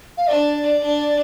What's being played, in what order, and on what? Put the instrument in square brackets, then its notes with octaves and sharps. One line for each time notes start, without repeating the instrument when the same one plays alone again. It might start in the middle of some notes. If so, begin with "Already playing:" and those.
[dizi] F5
[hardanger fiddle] D4 [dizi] D5
[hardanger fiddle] D4